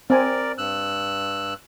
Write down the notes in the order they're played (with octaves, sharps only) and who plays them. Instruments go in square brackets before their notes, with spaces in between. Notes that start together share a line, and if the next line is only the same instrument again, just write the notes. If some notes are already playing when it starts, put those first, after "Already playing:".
[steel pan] C4 G#5 [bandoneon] A#4 D5
[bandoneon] G2 E6 F#6